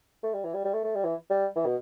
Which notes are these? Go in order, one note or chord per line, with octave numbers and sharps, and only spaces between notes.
A3
G3
E3
G3
G3
A3
A3
G3
E3
G3
E3
B2